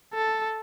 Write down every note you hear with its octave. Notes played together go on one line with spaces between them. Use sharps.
A4